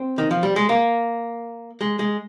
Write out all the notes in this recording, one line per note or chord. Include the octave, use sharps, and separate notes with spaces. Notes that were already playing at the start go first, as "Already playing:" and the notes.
Already playing: C4
D#3
F3
G3
G#3
A#3
G#3
G#3